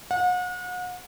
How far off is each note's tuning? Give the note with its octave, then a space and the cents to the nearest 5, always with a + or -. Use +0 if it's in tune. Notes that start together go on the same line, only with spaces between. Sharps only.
F#5 -40